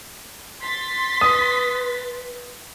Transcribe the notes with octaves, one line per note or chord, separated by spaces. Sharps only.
C6 A6 B6
B4 D#6